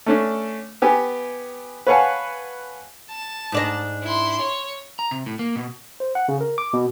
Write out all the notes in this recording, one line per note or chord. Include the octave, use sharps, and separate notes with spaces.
A3 C#4 D4
B3 G4 G#5
B4 C#5 F5 F#5 G#5 A5
A5
G#2 D4 D#5
E4 C6
C#5
A#5
C3
A2
A#3
B2
C5
F#5
C#3
A#4
D6
B2